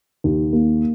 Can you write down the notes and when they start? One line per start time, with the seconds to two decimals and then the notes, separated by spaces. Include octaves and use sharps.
0.24 D#2
0.53 A#3